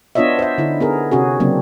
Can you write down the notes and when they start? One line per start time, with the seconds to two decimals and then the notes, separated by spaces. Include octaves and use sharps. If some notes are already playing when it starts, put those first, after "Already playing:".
0.15 B3 D4 F4 C#5 D#5 E5
0.39 C5 E5
0.58 D3 D#4 E4
0.80 B3 G#4 A#4
1.12 C3 C#4 F#4 G#4
1.40 C#3 F#3 A#3 C4 D4